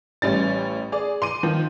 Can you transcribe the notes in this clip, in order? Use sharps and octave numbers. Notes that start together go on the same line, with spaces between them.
A1 G3 C#4 A6
G#4 D5
C6 D6 D#7
D#3 F3